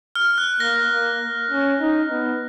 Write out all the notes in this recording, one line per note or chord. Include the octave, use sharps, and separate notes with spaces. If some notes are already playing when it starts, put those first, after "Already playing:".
F6
F#6
A#3 A#6
A#3
C#4
D#4
B3